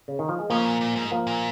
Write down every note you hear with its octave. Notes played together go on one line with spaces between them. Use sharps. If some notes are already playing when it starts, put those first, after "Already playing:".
C#3
D#3
F3
G#3
C#3 F3 A#3
A#2
A#2
G#2
F3 A#3
A#2